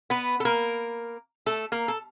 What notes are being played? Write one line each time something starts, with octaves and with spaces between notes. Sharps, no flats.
B3 B4
A4
A#3 A#4
A3 A4
A#3 A#4
A4